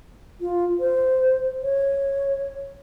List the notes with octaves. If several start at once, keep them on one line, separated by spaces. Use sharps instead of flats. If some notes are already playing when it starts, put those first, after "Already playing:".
F4
C5
C#5